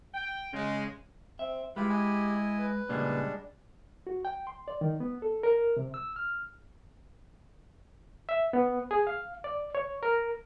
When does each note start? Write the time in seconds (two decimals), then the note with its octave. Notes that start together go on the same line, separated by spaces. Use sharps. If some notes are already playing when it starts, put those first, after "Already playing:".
0.14 G5
0.53 C#3 G#3
1.39 C4 E5
1.76 G#3 E4 F4 G4 B4 B5
1.89 E4 D#5 G#5
2.59 B4
2.89 A#2 C#3 G3 G#3 A#3 D4
4.07 F#4
4.25 G5
4.47 C6
4.68 D5
4.81 D#3
5.00 B3
5.22 A4
5.43 A#4
5.77 C3
5.94 E6
6.16 F6
8.29 E5
8.53 B3
8.91 G#4
9.07 F5
9.44 D5
9.75 C#5
10.03 A#4